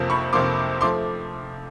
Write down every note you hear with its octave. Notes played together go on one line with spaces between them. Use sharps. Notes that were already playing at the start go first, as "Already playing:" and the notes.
Already playing: F2 C3 F3 A#3
B5 C#6
F2 C3 F3 A#3 C6 D6
F3 A3 C6 D6